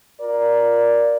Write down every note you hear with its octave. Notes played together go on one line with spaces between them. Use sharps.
F4 A#4 D5